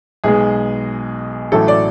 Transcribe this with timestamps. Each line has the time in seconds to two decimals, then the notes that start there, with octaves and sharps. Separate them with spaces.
0.24 B1 B2 G#3 G#4
1.52 A1 A2 F#3 A4
1.68 D5